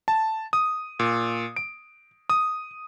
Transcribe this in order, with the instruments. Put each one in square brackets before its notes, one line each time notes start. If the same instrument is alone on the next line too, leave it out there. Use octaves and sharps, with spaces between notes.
[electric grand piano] A5
D#6
A#2
D7
D#6